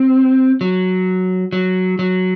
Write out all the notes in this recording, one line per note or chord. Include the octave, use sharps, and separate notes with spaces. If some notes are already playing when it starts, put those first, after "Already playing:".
Already playing: C4
F#3
F#3
F#3